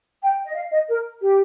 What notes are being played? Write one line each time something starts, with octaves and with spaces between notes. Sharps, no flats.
G5
D#5
F5
D#5
A#4
G4